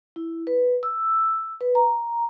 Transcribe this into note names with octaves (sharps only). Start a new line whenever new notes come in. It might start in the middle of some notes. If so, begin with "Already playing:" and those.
E4
B4
E6
B4
A#5